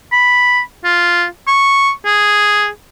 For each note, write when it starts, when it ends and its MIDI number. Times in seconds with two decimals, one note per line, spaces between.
0.12 0.60 83
0.84 1.25 65
1.47 1.91 85
2.05 2.69 68